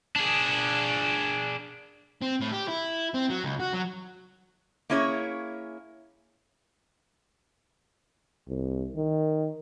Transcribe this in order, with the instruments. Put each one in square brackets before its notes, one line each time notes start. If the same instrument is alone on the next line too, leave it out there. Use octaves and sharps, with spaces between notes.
[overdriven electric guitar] D4 G#4
[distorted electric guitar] C4
A2
G4
E4
C4
F#3
C#2
F#4
F#3
[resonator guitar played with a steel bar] A#3 C#4 E4 G#4 C#5
[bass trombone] C2
D#3